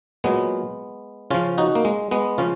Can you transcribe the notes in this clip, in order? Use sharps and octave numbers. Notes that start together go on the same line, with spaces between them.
A#2 F#3 G#3 B3
C#3 F3 C#4 F4
D#4 F#4
A#3
G#3
G#3 B3
C#3 F3 C#4 F4